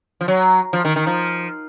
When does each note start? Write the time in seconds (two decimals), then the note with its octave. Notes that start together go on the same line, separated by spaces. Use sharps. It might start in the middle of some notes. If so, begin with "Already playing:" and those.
0.21 F3
0.28 F#3
0.73 F3
0.85 D#3
0.96 D#3
1.07 F3